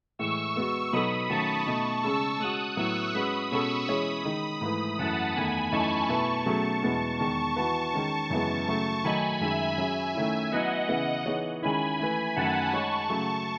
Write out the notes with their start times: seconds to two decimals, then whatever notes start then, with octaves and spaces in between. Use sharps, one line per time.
0.19 A2 E3 G#3 C#6 E6
0.56 G#3 B3 F#4
0.92 B2 F#3 B3 D#4 A4 B5 D#6
1.29 D#3 F#3 A3 C#4 A5 C#6
1.67 B2 A3 D#4
2.03 C#3 G#3 C#4 G#4 C#6 E6
2.40 G#3 C#4 F#4 D#6 F#6
2.77 A2 F#3 B3 E4 C#6 E6
3.14 G#3 C#4 F#4 B4 B5 D#6
3.51 B2 G#3 C#4 F#4 A4 C#6 E6
3.88 E3 G#3 C#4 G#4 C#5 B5 D#6
4.25 D#3 G#3 D#4
4.61 G#2 E3 A3 E4 B4
4.99 F#2 E3 A3 F#5 A5
5.35 E2 D#3 A3 G#5 B5
5.72 F#2 E3 A3 D#4 A5 C#6
6.09 B2 A3 E4 B4 A5 C#6
6.46 B2 F#3 A3 C#4 G#4
6.83 E2 B2 G#3 B3 E4
7.19 E2 D#3 G#3 A5 C#6
7.56 E3 B3 F#4 B4 A5 C#6
7.93 D#3 G#3 C#4
8.30 F#2 C#3 E3 G#3 B3
8.67 C#3 F#3 A3 A5 C#6
9.04 D#3 F#3 A3 D#4 G#5 B5
9.41 F#2 D#3 G#3 E5 G#5
9.78 F#3 C#4 G#4
10.15 D#3 A3 C#4 E4
10.52 F#3 B3 E4 D#5 F#5
10.89 C#3 E3 B3 E4 B4
11.26 E3 B3 D#4 G#4 C#5
11.62 D#3 G#3 C#4 E4 G#5 B5
11.99 E3 A3 E4 B4 G#5 B5
12.36 F#2 D#3 F#3 A3 F#5 A5
12.73 G#3 D#4 G#4 C#5 A5 C#6
13.09 C#3 F#3 A3